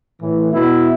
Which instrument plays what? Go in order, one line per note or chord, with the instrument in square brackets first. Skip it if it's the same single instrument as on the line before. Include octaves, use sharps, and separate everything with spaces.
[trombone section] A2 E3
B2 B3 E4